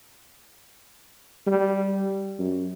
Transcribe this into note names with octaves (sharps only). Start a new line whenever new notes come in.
G3
F#2